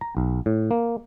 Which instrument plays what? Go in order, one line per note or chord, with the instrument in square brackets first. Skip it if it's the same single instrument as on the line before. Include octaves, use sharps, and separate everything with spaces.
[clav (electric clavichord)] A#5
B1
A2
A#3